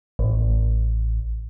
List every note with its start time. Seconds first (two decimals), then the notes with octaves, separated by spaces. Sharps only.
0.19 A1